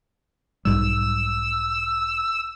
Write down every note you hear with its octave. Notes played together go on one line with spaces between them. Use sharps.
B1 G#2 G3 E6